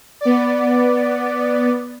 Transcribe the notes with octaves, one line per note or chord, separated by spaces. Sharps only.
B3 D5